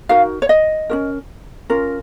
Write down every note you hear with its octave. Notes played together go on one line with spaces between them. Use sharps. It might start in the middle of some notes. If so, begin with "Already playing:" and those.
D#4 F#4 A#4 F5
C#5
D#5
C#4 F#4 A#4
C#4 F4 A#4